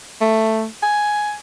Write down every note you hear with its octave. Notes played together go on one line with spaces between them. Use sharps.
A3
G#5